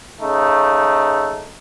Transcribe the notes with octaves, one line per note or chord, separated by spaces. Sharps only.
C#3 A3 D#4